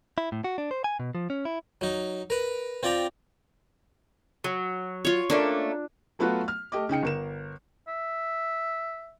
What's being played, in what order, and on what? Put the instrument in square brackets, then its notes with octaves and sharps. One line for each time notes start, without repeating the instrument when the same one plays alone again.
[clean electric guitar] E4
A2
F#4
D4
C5
G#5
B2
F3
C#4
E4
[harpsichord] F#3 D#4
A#4 B4
C4 F4 D5 G5 A#5
[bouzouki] F#3
[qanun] F4 C#5
[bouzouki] A3 A#3 C#4 [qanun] D4
[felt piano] F#3 A3 B3 F4 F#4 B4
F6
A3 G4 D#5 D6
C#3 D#4 G5 C#7
G1 A#4 E7
[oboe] E5